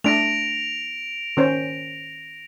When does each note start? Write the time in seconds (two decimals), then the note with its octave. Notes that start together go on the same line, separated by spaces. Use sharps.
0.04 A3 D4 A#6 D7 F7
1.37 D#3 C#4 C5